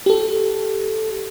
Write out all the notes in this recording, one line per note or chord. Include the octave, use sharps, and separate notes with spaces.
G4 A4